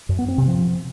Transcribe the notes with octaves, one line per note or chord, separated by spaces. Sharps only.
F#2
B3
C4
C3
F3